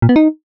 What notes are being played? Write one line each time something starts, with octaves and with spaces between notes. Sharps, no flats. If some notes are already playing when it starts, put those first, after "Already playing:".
A#2
B3
D#4